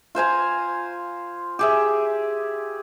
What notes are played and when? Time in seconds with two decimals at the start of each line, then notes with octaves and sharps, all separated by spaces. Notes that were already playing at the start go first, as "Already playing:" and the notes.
0.15 F4 C5 G#5 A#5
1.59 G4 G#4 E5